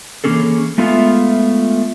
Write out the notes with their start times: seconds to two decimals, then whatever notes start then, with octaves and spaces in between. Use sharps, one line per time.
0.24 E3 F3 A#3 C#4 G#4 A4
0.78 G#3 A3 B3 F4 E5 F5